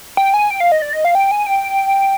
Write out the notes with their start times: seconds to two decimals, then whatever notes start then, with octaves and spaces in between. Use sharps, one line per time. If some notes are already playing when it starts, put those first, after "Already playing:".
0.17 G5
0.34 G#5
0.51 G5
0.60 F5
0.72 D#5
0.82 D5
0.93 D#5
1.05 F5
1.15 G5
1.31 G#5
1.47 G5